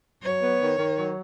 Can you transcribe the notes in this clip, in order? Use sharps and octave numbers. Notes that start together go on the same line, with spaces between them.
F#3 C#5
B3
D#3
D#3
F#3